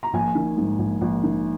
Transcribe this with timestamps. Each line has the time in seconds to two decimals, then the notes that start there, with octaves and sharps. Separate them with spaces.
0.03 A#5
0.13 A#1 G#5
0.35 D#3
0.57 G#2
0.78 A#1
1.01 A#1
1.23 D#3